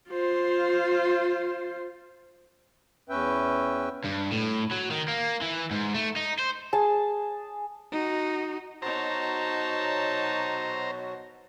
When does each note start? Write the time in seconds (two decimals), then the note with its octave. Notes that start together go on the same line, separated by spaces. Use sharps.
0.10 F4 C5
3.09 E2 C#4 B4 E5 G5
4.04 G2
4.31 A2
4.71 F#3
4.91 D#3
5.08 A#3
5.42 E3
5.71 G#2
5.95 A3
6.16 D#4
6.39 C5
6.73 G#4 A5
7.92 D#4 F#4
8.82 B2 F#3 D#4 F#4 C5 A5 A#5